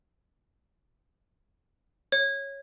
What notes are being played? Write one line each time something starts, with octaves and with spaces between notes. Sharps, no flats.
C#5